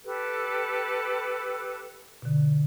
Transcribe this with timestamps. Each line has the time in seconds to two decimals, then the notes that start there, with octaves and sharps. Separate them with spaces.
0.05 G4 A4 B4
2.22 B2 D3